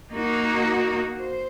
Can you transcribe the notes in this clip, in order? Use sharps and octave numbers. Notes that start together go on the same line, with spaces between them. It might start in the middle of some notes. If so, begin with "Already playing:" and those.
A#3 D#4 F#4
C5